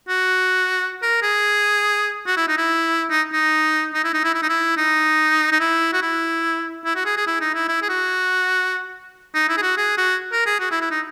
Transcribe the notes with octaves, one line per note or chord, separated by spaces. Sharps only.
F#4
A#4
G#4
F#4
E4
D#4
E4
D#4
D#4
D#4
E4
D#4
E4
E4
D#4
E4
D#4
D#4
E4
F#4
E4
E4
F#4
G#4
G#4
E4
D#4
E4
E4
G#4
F#4
D#4
E4
G#4
F#4
G#4
F#4
A#4
G#4
F#4
E4
E4
D#4